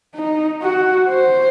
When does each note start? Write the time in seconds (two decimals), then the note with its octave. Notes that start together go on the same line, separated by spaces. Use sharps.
0.15 D#4
0.62 F#4
1.10 C5